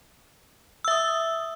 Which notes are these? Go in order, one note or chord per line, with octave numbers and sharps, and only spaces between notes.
E5 D#6 E6